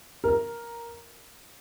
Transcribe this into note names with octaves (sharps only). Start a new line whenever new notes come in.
A#4